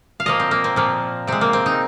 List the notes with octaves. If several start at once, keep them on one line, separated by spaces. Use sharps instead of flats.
F5
A#2 F3 A#3 D#5
C4
A#3
C4
A#2 F3 A#3
C3 G#3 C4
A#3
C4
D#4